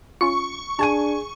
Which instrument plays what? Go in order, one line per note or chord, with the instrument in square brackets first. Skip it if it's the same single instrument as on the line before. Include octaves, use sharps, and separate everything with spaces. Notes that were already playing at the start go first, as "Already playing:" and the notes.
[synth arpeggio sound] C#4 F4 [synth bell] C#6
[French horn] D4 [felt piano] G#4 G#5 D#7 [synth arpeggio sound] A5 G#6